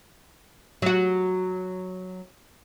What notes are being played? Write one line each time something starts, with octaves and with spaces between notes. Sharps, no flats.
F#3 F#4